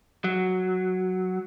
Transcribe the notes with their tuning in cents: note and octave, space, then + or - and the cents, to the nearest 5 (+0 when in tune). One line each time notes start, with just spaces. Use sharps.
F#3 +0